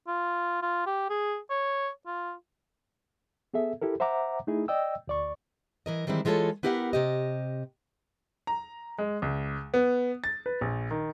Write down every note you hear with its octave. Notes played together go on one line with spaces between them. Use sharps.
F4
F4
G4
G#4
C#5
F4
B3 G#4 A4 E5
E4 G4 A4 A#4
C5 E5 F#5 A#5 D6
A3 D#4 E4 G#4
D5 D#5 G5 E6
D2 D5 C#6
E3 A#4 D#5
D#3 E3 G3 G#3 C4 E4
E3 G#3 F4 F#4 A4 C#5
B3 E4 G4 A#4 F5 F#5
C3 G4 D#5
A#5
G#3
C#2
B3
A6
B4
A#1
D#3